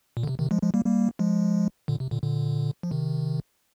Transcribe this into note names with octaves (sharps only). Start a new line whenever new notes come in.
A#2
D3
C3
C3 D#3
F3 G#3
F3 G#3
G3 A#3
G3 A#3
F3 G#3
A#2 D3
C3
A#2 D3
A#2 D3
F3
C3 D#3